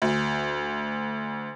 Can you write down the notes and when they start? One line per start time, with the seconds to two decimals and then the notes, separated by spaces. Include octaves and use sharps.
0.02 D2